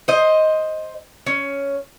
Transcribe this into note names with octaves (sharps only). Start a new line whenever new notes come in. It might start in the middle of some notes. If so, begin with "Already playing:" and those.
C5 D#5
C#4